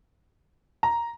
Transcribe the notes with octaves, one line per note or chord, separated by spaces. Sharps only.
A#5